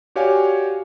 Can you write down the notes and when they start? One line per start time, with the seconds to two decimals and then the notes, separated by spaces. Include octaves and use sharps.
0.16 F#4 G4 C#5 D5 F5 G#5